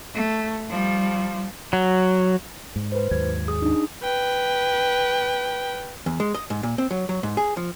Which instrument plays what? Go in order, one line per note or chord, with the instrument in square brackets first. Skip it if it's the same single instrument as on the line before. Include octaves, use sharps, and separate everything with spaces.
[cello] A3
F3 G3
[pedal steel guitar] F#3
[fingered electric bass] G#2
[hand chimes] B4 C5
[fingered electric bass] D#2 G#2 F#3 [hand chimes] G#6
[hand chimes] G#4 D#6
D4 D#4 G#4
[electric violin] B4 G5
[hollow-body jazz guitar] E2
G#3
D#5
G#2
A#2
C4
F#3
F#3
G#2
G#4
F3